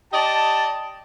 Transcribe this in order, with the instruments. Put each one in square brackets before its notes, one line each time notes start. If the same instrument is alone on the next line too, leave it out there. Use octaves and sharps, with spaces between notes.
[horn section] G4 D5 D#5 A5